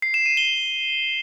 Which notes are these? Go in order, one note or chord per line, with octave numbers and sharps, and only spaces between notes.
C7
E7
D#7
G7